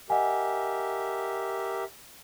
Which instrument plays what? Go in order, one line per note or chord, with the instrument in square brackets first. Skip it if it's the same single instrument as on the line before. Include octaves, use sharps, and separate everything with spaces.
[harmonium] G4 A#4 E5 [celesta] D#5 F#5 G#5